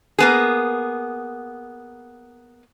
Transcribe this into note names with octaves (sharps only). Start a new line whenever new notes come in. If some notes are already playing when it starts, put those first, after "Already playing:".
A#3 B3 G#4